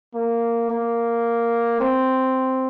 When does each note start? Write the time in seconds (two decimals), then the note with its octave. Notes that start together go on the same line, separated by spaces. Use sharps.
0.15 A#3
0.70 A#3
1.81 C4